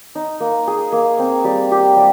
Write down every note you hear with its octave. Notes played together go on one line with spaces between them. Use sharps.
D#4
A#3
G#4
A#3
C4
G3
G4
G3